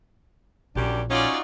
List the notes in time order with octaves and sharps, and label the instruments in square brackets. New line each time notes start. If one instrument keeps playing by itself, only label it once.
[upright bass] A#1 [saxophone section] F#2 G3 G4 [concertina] D4
[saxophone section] C#4 [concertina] D#4 F#4 C#6 [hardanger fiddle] F4 D5